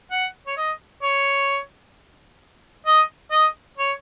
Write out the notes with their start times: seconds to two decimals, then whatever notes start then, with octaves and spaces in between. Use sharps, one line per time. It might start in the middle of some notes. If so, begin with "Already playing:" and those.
0.11 F#5
0.47 C#5
0.57 D#5
1.03 C#5
2.87 D#5
3.31 D#5
3.78 C#5